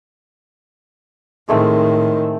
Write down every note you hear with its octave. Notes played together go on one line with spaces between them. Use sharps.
A2 D#3 G#3 A3 C4